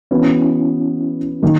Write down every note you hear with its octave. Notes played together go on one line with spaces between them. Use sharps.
E3 B3 C#4 E4 F#4 B4
D#3 F#3 A#3